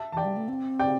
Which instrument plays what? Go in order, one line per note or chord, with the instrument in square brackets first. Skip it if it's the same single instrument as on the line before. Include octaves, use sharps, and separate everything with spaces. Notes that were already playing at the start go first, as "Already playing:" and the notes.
Already playing: [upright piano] E5 A5
[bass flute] E3 [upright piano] D5 G5 A5
[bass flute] G3
A3
C4
[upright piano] D5 G5